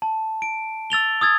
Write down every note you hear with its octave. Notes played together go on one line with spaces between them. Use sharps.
A5
D7
E6 A6 F7 G7
D#6 E6 G#6 A6